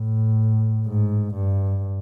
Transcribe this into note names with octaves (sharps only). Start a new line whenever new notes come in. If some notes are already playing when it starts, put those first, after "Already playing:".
Already playing: A2
G#2
G2